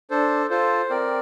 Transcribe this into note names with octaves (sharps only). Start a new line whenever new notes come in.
D4 A4 C5
F4 A4 C5
C4 A#4 D5